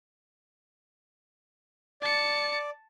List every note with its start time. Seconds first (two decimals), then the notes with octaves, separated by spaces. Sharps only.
2.02 D5 A5 C#7